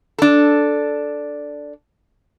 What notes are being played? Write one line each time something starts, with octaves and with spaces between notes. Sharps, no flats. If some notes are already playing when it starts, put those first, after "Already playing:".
D4 A4